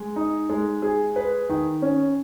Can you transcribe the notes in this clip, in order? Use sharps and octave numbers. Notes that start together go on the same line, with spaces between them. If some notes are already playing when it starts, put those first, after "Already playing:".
Already playing: G#3
D#4
G#3
G#4
B4
D#3
C#4